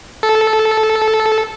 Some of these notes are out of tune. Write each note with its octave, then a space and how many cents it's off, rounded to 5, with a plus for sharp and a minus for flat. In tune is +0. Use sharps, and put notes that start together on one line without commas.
A4 -10